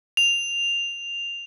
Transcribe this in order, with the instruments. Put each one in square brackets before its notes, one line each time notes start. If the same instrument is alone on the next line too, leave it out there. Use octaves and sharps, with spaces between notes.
[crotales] F7